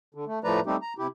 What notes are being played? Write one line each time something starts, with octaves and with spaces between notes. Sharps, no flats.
D3
A3
A2 F3 A3 B4 D5 A#5
G3 A3 C4 D#4 G4
A#5
C3 E4 G4